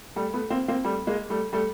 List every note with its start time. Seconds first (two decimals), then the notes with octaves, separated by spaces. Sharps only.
0.16 G3 A3
0.34 A3 B3
0.50 A#3 C4
0.68 A#3 C4
0.84 G3 A3
1.07 G#3 A#3
1.30 G3 A3
1.53 G3 A3